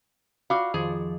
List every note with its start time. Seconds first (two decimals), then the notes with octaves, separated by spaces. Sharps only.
0.50 F4 F#4 D5 F5 D6
0.74 F2 D#3 F3 G#4